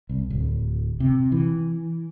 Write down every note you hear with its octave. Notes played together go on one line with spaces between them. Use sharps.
C2
D1
C3
E3